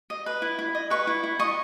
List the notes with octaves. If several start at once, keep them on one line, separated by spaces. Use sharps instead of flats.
D#5
B4
E4
E4
D#5
B4 C#6
E4
E4
D#5 C#6